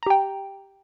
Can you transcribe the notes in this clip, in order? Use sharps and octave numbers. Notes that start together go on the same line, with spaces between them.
G4 G5 A#5